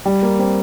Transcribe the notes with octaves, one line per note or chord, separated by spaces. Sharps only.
G3
A#3
C4